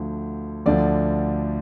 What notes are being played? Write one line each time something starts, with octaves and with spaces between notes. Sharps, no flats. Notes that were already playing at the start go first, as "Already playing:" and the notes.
Already playing: D2 D3 F3
D2 D3 F3 D5